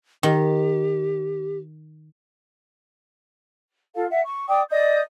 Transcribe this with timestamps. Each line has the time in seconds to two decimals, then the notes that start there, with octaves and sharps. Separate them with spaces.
0.23 D#3 G4
3.94 F4 A4 F5
4.08 E5 F#5
4.24 C#6
4.47 D5 G5 D6 D#6
4.70 D5 D#5 D#6 G6